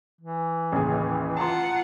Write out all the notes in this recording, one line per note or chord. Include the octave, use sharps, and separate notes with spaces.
E3
A1 D#2 C#3 G#4
F4 F#5 A5 A#5 C6